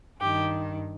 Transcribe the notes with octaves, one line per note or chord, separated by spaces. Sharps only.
G2 D#3 G4